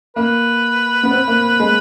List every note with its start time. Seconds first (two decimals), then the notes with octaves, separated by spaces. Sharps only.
0.16 A#3 B4
1.03 B3
1.11 C4
1.28 A#3
1.60 G#3